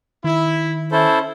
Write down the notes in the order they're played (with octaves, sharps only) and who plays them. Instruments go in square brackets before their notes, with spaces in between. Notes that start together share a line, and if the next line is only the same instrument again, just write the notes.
[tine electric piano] D#3 [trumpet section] E4
[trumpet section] C#4 [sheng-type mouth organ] E4 A4 C5